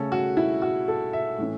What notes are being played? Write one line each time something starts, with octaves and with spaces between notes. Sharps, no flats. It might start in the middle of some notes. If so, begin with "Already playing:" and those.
Already playing: C#3 A3 C#4 A4
F#4
E4
F#4
A4
E5
A2 E3 C#4